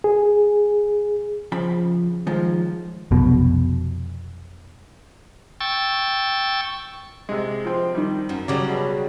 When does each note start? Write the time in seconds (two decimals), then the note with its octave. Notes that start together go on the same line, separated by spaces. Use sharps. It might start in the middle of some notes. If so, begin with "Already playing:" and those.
0.04 G#4
1.52 C#3 F3 B5
2.27 D#3 F3 G#3
3.11 F1 B1 B2
5.60 G5 C#6 E6 A6
7.29 C3 G#3
7.65 F3 C4
7.95 D#3 G3
8.29 F#2
8.48 C#3 F#3 G3 D5
8.69 B2